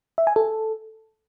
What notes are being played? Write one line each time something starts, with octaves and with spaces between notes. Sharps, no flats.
E5
G#5
A4